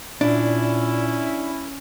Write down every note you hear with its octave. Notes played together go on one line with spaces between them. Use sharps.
A#2 C#4 D4 E4